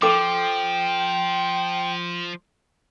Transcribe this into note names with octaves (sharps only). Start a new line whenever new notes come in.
F3 A4 G5 D6